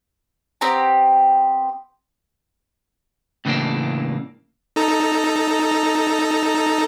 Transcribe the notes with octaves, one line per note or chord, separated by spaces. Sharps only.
B3 C4 G4 A#5
A2 C#3 E3 A3 A#3 D4
D#4 A4 A#5